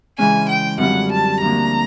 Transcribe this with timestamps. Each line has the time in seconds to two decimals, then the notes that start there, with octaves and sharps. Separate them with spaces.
0.18 C#3 E3 G#3 C#4 G#5
0.49 G5
0.78 F#2 D3 G3 C4 F4 F#5
1.11 A5
1.41 D2 D3 F3 A#3 A#5